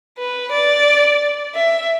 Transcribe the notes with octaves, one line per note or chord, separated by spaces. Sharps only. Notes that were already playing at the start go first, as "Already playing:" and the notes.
B4
D5
E5